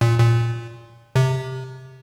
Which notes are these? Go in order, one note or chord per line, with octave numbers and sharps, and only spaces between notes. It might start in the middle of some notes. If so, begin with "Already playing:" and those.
A#2
A#2
C3